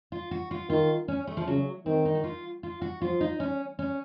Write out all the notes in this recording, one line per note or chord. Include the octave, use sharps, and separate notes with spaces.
F4
F#4
F4
D#3 F4
C#4
A3
F3
C#3 F#3
D#3 C4
D#4
F#4
F4
F4
F#4
F3 F4
D#4
C#4
C#4